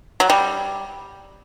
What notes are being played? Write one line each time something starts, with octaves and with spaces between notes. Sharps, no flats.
F#3
G3